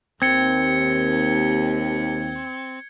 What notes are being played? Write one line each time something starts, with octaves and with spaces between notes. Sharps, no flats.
D#2 C4 G#6 C#7 G7